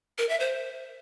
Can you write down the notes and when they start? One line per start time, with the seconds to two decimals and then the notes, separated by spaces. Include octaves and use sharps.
0.18 A#4
0.29 E5
0.40 C5